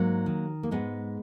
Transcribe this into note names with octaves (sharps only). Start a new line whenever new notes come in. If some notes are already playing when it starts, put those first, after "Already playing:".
Already playing: G#2 F#3 A#3
D#3
A#3
G#2 G#3 B3